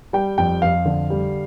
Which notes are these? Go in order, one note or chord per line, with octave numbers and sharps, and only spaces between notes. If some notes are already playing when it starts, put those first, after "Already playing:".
G3 G5
F2 G5
F2 F5
D3
G3